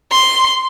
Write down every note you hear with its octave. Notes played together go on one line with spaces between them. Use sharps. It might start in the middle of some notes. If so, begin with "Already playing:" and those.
C6